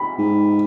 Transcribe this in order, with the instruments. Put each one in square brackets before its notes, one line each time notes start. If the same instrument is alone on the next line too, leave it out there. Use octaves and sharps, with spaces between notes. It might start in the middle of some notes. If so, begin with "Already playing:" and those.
Already playing: [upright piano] B5
[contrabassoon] G#2